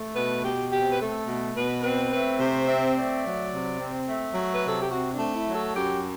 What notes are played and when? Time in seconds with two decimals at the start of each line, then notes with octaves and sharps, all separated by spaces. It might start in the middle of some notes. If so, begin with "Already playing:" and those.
Already playing: A3
0.15 B2 B4
0.44 B2 G4
0.72 C4 G4
0.91 B4
0.99 A3 A4
1.27 B2
1.55 B2 B4
1.83 C4 B4
2.12 A3 B4
2.39 C3 C5
2.67 C4 E5
2.95 A3 D5
3.23 F#3
3.51 C3
3.80 C4
4.07 A3
4.34 F#3
4.54 B4
4.62 C3 A4
4.79 G4
4.90 C4 F#4
5.11 D4
5.19 A3
5.32 E4
5.46 F#3
5.53 A4
5.74 F#2 G4